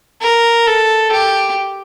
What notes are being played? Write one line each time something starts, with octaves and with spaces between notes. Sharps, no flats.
A#4
A4
G4